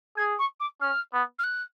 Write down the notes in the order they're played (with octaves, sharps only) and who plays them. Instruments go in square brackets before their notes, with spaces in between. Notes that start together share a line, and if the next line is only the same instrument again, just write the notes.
[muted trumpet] G#4 [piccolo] G#6
[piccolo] C#6
D6
[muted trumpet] C#4 [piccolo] F6
[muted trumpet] B3
[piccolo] F6
F#6